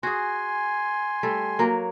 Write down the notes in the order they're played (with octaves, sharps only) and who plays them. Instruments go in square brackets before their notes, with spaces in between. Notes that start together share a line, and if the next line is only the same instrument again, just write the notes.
[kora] F#4 G#4 [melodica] G#5 C6
[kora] G3 A3
F#3 A#3